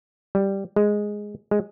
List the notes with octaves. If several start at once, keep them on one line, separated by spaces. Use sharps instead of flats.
G3
G#3
G#3